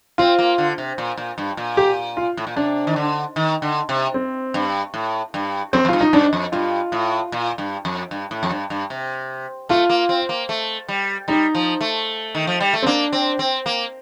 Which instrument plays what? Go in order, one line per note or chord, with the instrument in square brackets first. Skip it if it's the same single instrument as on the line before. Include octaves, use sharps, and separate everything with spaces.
[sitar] C4 [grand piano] F4
[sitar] A#3
D3
C3
A#2
A#2
G2
A#2
[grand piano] G4
F4
[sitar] A2
A#2
[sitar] C3 [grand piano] D4
[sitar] D#3
D3
D#3
D3
C3
[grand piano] C4
[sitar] G2
A2
G2
[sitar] F2 [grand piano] C4
[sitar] F2
[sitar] G2 [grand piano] F4
[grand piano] D#4
[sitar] G2 [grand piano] D4
[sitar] F2
[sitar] G2 [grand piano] F4
[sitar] A2
A#2
G2
F2
G2
A2
F2
G2
G2
C3
[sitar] A3 [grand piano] F4
[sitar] A#3
C4
A#3
A3
G3
[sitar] G3 [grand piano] D#4
[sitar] F3
A3
D#3
F3
G3
A3
[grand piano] C4
[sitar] A#3 [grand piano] D4
[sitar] C4
C4
A#3